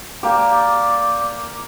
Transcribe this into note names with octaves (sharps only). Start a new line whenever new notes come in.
A#3 G4 D5